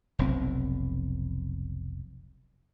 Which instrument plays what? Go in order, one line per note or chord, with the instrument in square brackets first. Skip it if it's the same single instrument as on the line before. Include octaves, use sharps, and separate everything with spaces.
[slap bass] F1 B1 F2 C4